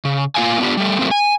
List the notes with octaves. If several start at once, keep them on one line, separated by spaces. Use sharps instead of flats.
C#3
A#3 F4 F5 G#5
B3 D4 F4 G4
G3 A3
F#3 A3 A#3 C4
G#5